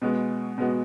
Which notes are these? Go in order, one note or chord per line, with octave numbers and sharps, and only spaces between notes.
B2 G#3 B3 F#4
B2 G#3 B3 F#4